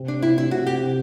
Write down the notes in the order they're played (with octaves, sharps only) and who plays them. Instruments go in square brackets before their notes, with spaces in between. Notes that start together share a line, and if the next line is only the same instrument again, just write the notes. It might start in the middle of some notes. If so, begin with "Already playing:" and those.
Already playing: [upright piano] C3
[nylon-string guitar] D4
[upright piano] C3 [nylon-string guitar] E4
[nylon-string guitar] E4
[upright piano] C3 [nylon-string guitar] F#4
[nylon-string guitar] G4
[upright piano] C3